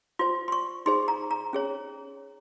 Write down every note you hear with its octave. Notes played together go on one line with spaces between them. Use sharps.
F4 C5 C6
C6
C#6
D#4 G#4 C5 C6
A#5
A#5
C#4 G#4 C#5